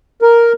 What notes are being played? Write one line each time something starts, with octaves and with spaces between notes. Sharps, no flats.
A#4